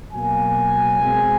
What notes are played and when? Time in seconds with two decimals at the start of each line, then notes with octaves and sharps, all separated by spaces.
0.13 B2 F#3 A#3 G#5
1.00 B2 G#3 C4